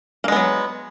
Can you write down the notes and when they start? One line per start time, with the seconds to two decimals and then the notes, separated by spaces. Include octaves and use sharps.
0.24 A#3
0.28 G#3
0.32 B3
0.36 F#3